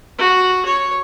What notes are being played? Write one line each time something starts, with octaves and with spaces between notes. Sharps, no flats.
F#4
C#5